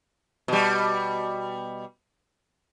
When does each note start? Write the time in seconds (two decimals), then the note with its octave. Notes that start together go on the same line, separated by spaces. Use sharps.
0.48 B2 G3